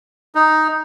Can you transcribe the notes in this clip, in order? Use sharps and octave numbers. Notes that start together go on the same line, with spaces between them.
D#4